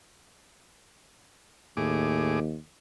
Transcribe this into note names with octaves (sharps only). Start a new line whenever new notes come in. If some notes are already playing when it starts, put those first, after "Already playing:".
D#2 A2 G#4 D6